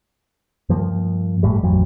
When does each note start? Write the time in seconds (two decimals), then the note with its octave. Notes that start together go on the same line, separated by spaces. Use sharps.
0.69 G2 F3 A#3
1.43 G1 A2 G3
1.63 A1 F2 F#3